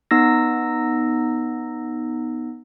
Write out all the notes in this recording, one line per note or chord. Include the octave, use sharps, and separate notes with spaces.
B3 D#4 E6 A#6